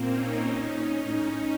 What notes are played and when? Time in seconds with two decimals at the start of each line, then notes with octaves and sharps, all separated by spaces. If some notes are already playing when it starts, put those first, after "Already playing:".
Already playing: A#2 A#3 C4
0.08 C#4 D#4
0.41 C#4 D#4
1.04 A2 C#4 D#4